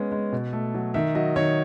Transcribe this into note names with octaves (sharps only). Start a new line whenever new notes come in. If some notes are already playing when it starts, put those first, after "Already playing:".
Already playing: G#3 B3 C#4
G#3
B2
A3
F#3
D#3 E5
F#3 D#5
D#3 C#5